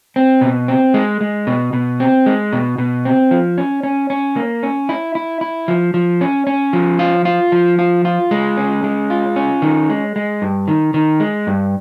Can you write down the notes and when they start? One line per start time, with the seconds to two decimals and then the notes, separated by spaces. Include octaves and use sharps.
0.16 C4
0.41 B2
0.68 C4
0.94 G#3
1.21 G#3
1.47 B2
1.73 B2
2.00 C4
2.26 G#3
2.53 B2
2.78 B2
3.05 C4
3.31 F3
3.58 C#4
3.83 C#4
4.10 C#4
4.36 A#3
4.63 C#4
4.89 E4
5.15 E4
5.41 E4
5.68 F3
5.94 F3
6.21 C#4
6.47 C#4
6.73 F3
6.99 F4
7.25 F4
7.52 F3
7.79 F4
8.05 F4
8.31 G#3
8.57 C#4
8.84 G#3
9.10 F4
9.36 C#4
9.62 D#3
9.90 G#3
10.16 G#3
10.42 G2
10.68 D#3
10.94 D#3
11.20 G#3
11.47 G2